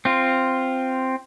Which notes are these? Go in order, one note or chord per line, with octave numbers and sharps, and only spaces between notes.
C4 F4